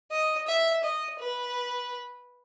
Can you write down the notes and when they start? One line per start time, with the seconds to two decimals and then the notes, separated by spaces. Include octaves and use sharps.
0.11 D#5
0.47 E5
0.83 D#5
1.19 B4